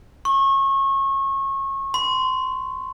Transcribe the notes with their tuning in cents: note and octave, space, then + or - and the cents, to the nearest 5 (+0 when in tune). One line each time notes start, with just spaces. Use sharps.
C#6 -30
C6 -25